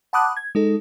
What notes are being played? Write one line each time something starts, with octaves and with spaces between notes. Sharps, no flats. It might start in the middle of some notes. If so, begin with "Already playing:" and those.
F#5 A5 B5 D6 D#6 F#6
G#6
G#3 D#4 A4